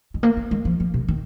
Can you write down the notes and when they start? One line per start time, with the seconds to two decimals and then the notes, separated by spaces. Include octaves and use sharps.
0.14 G#3
0.23 A#3
0.37 A#3
0.51 G#3
0.65 F3
0.80 F3
0.94 C3
1.08 D#3